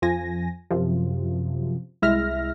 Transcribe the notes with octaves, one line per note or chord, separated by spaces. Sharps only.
F2 F3 G#5 A#6
F#2 C3 F3
C2 G#3 E4 E5 F6 A#6